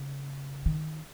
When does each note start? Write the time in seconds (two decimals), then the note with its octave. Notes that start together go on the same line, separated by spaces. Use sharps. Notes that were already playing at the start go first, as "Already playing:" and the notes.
Already playing: C#3
0.66 D#3